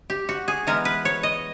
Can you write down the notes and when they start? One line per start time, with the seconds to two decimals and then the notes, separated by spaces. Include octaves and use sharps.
0.10 G4
0.29 F#4
0.48 G#4
0.67 E3 G#3 B3 A#4
0.85 B4
1.05 C#5
1.23 D#5